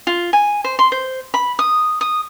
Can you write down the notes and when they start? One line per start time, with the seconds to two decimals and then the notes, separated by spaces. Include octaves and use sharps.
0.07 F4
0.33 G#5
0.64 C5
0.79 C6
0.92 C5
1.34 B5
1.59 D#6
2.01 D#6